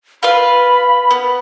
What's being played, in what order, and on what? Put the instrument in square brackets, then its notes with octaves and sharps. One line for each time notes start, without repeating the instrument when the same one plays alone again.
[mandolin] F4 B4 F5 [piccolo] B5
[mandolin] B3